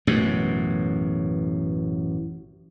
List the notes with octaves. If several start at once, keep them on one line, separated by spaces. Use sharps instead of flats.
A1 F#2 B2